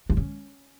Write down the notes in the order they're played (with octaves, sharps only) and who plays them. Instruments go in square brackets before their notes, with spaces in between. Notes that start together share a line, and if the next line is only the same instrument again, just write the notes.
[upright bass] D4
C#4